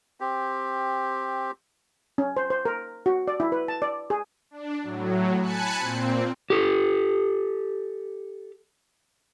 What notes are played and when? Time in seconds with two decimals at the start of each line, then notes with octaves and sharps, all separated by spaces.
0.20 C4 G4
2.18 C#4
2.37 C5
2.50 C5
2.65 A#4
3.06 F#4
3.28 D5
3.40 E4
3.52 B4
3.68 A5
3.82 D5
4.10 G#4
4.51 D4
4.83 A2 F#3
5.41 G#5 A5 B5 F#6 C#7
5.78 A#2 C4
6.50 G4 A4